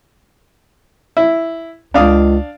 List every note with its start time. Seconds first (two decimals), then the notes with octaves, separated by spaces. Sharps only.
1.17 E4
1.94 C#2 D4 F5 D#6